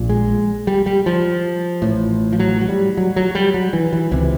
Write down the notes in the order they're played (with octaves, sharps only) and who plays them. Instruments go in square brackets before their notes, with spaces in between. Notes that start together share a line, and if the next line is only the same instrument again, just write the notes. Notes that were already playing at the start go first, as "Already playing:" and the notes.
Already playing: [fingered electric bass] A#1 A#2
G#3
G3
G3
F3
A1 A2
F3
F#3
F#3
G3
F#3
F#3
G3
F#3
E3
E3
C#2 C3 E3